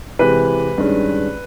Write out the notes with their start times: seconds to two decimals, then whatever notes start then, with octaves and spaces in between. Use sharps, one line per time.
0.19 C3 E3 G#3 B4
0.78 G2 D#3 G#3 C#4